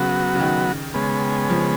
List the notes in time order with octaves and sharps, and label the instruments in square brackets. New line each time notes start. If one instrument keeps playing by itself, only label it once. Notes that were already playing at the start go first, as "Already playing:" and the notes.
Already playing: [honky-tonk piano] C#3 [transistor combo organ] F#3 B3 F#4
[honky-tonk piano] C#3
D#3
[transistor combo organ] C#3 G#3 B3
[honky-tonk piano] F3